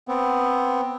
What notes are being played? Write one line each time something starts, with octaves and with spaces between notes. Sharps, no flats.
B3 C4